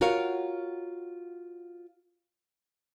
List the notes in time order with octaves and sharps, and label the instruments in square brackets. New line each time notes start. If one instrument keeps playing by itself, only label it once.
[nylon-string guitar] F4 F#4 A#4 C#5 F5